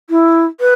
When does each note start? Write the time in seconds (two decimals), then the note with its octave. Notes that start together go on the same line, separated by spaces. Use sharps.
0.10 E4
0.60 B4